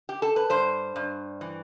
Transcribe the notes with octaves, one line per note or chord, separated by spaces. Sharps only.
G4
A4
B4
G2 C5
G2
E3